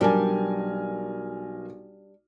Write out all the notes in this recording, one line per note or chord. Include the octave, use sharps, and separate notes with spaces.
B1 G3 D4 A#4 G#5